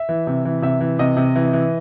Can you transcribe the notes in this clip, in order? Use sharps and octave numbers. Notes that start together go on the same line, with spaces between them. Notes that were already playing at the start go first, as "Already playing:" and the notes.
Already playing: E5
E3
C3
E3
C3 E5
E3
C3 D#5
C3
E3
E3